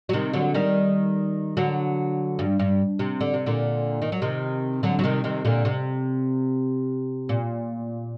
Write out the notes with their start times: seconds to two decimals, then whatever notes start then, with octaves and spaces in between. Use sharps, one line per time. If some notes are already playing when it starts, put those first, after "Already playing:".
0.09 F#3
0.13 C3 D#3
0.34 D3 F#3
0.54 D#3 G3
1.57 D3 F#3
2.39 G2
2.59 G2
2.99 C3
3.21 D3
3.34 C3
3.46 A#2 D3
4.02 D#3
4.12 F#3
4.22 C3 D#3
4.83 D3 F#3
4.99 F#3
5.04 C3 D#3
5.24 C3 D#3
5.45 A#2 D3
5.65 C3
7.29 A#2